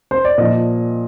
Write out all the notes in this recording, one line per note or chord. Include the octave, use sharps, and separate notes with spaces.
C5
D5
A#2 F3 D#5